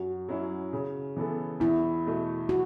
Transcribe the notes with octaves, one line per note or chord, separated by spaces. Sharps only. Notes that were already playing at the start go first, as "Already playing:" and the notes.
Already playing: F#2 F#4
F#3 C#4 E4
C#3
E3 B3 A4
E2 E4
B2 A3
F#4